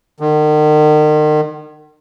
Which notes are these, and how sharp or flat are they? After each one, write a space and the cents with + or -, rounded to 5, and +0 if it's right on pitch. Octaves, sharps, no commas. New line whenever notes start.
D#3 -40